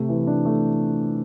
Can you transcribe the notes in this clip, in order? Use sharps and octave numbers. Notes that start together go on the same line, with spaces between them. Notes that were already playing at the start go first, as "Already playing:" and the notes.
Already playing: C3 A3
E3
D4
A3